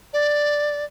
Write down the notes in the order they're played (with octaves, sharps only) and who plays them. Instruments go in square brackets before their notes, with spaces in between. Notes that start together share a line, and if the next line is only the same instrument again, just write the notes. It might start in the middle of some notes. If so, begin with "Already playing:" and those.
[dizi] D5